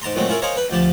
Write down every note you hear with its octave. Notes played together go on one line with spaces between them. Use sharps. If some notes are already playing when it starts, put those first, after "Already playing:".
G#2 A5 A#5 C6
A#2 F#3 G#3 A3 C4
C#4 E4 F4 G#4 A#4
G#4 A#4 C5 C#5 D#5 F5
B4 G5
D2 F3 G4 A5